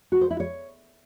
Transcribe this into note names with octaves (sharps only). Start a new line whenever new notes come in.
F#4
C5
E4
C#5